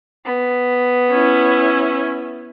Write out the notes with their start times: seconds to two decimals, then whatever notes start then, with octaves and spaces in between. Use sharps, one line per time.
0.25 B3
1.11 C#4 E4